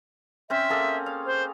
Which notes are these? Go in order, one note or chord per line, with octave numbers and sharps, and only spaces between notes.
C4 C#4 C5 E5
A#3 G#4 A4
F5
C5